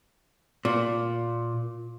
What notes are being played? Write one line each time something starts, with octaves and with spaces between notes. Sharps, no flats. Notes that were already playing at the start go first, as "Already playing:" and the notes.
A#2